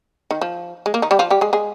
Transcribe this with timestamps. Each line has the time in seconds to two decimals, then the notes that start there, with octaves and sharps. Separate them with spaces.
0.31 D#3
0.41 F3
0.86 G#3
0.94 A#3
1.02 D#3 D#4
1.11 G3 G4
1.19 F3 F4
1.30 G3 G4
1.41 G#3 G#4
1.53 G#3 G#4